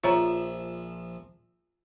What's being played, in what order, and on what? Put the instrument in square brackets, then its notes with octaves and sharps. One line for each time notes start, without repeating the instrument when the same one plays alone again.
[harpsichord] A#1 F3 E5 [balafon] F4 C#5 A#5